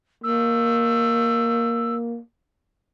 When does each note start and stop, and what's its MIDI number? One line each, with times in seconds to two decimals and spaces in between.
0.24 2.19 58
0.24 1.96 88